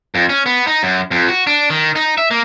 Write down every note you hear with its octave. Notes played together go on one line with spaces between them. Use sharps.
F2
C#4
B3
D#4
F#2
F2
F#4
D4
D#3
D#4
E5
A#3